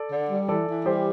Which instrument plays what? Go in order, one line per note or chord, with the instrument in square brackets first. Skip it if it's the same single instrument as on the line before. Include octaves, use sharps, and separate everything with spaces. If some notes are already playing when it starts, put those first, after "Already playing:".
Already playing: [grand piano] A4 D5
[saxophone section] D3
G3
[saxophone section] E3 [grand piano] A4 D5
[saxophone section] E3
[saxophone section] G3 [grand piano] G4 C5